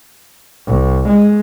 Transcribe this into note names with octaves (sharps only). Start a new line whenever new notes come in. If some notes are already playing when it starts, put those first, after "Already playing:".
C2
G#3